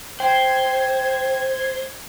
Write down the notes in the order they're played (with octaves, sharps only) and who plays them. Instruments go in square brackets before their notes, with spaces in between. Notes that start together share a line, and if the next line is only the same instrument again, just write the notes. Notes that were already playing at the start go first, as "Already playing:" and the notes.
[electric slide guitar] C5 [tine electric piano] G5 [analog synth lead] G#6